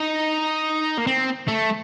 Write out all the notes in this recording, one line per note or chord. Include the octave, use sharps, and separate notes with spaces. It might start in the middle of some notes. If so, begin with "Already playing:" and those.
Already playing: D#4
A#3
C4
A3